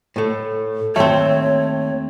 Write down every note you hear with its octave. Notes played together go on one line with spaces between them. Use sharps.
A2 A3
D#2 A3 C4 C#5